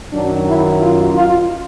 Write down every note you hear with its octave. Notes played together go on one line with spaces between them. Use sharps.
F#2 D#3 F#3 D4
E4
F4
F4